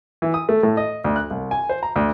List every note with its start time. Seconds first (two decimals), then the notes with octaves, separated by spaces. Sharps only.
0.22 E3
0.34 D#6
0.49 A3
0.63 A2
0.77 D#5
1.04 D2
1.16 F#6
1.30 C2
1.51 G#5
1.69 C5
1.83 A#5
1.96 D2